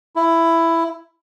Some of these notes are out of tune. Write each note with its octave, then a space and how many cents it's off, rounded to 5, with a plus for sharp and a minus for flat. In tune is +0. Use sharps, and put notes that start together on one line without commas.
E4 +10